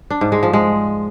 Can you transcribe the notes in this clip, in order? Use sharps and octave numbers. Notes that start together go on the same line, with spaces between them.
D4
G#2
G#3
F3
G#3